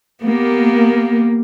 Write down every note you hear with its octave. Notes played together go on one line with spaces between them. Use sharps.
A#3 B3 G4